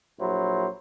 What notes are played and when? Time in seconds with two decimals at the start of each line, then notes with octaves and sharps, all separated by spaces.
0.19 A#1 F#3 E4 C5